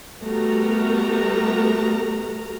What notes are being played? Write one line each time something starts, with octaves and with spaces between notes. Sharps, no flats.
G3 A3 B3 F#4 A#4 A#5